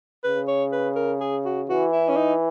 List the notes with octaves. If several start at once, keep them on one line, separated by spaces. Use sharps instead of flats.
C#3 B4
C#5
B4
A#4
G#4
F#4
E3 F#4
E4
C#4
D#4